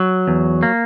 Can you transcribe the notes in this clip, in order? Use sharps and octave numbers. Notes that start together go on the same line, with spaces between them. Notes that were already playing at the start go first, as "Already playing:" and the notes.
Already playing: F#3
E2
A#3